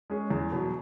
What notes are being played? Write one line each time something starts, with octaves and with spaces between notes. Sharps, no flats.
G#3 C#4 G#4
E2
B2 F#3